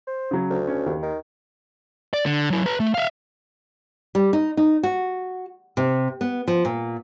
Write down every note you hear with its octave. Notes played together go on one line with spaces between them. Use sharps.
C5
C#3 F#3
D2
C#4
D#2
D#3
D5
D3
F#3 E4
B4 A#5
A3 E5
E5 F5
G3
D#4
D#4
F#4
C3
B3
F3
A#2